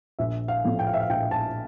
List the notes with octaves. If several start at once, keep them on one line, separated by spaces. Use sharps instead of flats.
A#1 E5
F5
A2 F3 C4
G5
F5
E5
F5
A#1 G5
A5